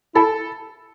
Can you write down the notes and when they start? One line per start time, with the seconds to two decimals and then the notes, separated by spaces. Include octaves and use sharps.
0.15 E4 A4